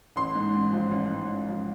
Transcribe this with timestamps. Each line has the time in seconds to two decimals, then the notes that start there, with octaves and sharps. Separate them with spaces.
0.16 A1 C6
0.35 G#2
0.54 A1
0.73 F3
0.91 A1
1.10 G#2
1.29 A1
1.48 F3